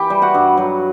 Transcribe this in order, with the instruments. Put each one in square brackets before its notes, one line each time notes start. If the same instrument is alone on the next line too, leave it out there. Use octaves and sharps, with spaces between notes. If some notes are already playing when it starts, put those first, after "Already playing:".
Already playing: [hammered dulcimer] E3 G4 G5
G3
F#4 F#5
G2
F#3